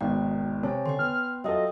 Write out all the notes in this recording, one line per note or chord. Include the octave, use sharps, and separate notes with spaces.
G#1 B2 D#3 G5
C3 C#5 G#5 A5
D3 G5 C6
B3 F6
F#3 F4 A4 D#5 E5 G5 D#6